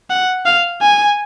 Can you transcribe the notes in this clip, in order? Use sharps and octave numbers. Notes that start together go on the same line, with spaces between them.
F#5
F5
G#5